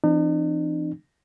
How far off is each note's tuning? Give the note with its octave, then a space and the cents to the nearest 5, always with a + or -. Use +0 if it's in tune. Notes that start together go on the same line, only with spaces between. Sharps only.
E3 +30 C4 +0 D#4 -45